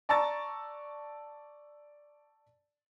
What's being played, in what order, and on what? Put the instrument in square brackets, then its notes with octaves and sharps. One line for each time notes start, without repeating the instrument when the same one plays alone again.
[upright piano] D5 A5 A#5 C#6 E6 A6